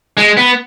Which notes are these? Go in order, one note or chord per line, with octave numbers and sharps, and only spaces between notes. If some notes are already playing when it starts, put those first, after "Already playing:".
G#3
B3